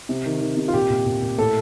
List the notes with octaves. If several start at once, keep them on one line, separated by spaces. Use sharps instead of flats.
C3
D#3
D#3
C3
F4
A#2 G4
A#2
A#2
A#2
A2 A4